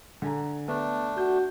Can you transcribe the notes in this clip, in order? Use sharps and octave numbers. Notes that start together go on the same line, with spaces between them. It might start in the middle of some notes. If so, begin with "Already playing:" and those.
D3 G#5 A#5
A3 B3 D4
F#4 G6